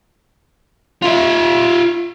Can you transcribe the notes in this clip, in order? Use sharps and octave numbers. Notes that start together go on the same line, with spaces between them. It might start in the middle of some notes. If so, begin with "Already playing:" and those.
F4 E5